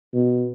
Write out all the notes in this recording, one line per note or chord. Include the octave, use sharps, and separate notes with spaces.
B2